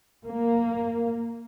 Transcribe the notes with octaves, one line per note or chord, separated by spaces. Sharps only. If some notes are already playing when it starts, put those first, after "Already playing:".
A#3